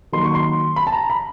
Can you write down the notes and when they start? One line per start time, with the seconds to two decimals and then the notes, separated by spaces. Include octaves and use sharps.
0.12 D#3 F#3 A#3 C6
0.24 C#6
0.35 C6
0.76 B5
0.87 A5
0.92 A#5
1.10 B5